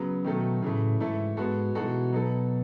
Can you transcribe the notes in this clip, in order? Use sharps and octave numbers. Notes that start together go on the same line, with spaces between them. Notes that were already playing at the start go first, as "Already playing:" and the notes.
Already playing: C#3 F#3 B3
B2 D#3 F#3 A3 D#4 A4
A2 C#3 E3 A3
G#2 E3 A3 E4 A4
G#2 G#3 B3 F#4 A4
B2 E3 G#3 D#4 F#4 A4
F#3 B3 D#4 A4